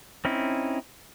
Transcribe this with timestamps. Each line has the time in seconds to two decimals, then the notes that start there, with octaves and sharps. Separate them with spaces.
0.25 C4 C#4 D#4 E4